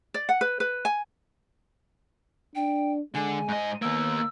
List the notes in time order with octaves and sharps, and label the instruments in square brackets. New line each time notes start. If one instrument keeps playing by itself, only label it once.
[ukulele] D5
F#5
B4
B4
G#5
[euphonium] D4 [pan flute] G5
[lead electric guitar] D3 [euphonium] G#3 [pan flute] G#5
[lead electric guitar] G#2 D#5
[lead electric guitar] D#3 A#3 [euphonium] B3 [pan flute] E6